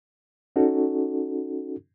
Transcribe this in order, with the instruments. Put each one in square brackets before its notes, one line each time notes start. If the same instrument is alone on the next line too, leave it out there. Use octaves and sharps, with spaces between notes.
[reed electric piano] C#4 D#4 F#4 A4